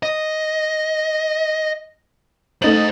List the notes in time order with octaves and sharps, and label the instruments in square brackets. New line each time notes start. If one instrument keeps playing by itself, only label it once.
[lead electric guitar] D#5
[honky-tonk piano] A3 D#4 F#7 [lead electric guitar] C5 D#5